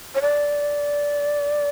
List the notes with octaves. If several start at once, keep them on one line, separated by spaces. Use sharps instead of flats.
C#5
D5